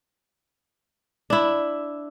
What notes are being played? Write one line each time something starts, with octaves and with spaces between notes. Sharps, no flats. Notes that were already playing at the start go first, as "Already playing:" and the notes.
D4 E4